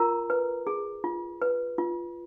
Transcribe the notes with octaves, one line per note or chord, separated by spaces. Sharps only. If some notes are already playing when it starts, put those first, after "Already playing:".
Already playing: F4 A#4 A#5
B4
G#4
F4
B4
F4